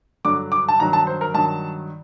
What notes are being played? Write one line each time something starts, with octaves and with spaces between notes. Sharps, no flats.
G2 D3 F#3 D6
D6
A5
G2 D#3 F#3 A#5
A5
C5
A#4
G2 D#3 F#3 A5